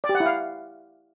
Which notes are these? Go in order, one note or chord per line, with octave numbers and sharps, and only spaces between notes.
D5
G4
F#5
E4
F5